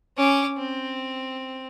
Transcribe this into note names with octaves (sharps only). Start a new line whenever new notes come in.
C#4 D6
C4